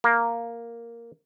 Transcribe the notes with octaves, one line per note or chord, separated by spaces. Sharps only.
A#3